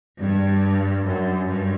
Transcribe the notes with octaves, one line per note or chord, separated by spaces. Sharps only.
G2
F#2
G2